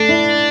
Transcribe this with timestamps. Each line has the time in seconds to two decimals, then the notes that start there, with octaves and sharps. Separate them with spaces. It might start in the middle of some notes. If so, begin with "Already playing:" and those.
Already playing: A3 D4
0.09 E4